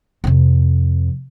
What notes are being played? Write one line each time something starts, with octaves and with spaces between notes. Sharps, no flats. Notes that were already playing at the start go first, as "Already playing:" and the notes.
F2 C3